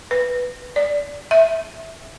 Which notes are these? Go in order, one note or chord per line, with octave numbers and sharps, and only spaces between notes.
B4
D5
E5